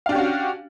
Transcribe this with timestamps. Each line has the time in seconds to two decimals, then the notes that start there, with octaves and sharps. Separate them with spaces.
0.06 F5
0.09 D4
0.12 G4
0.15 C#4
0.19 F#4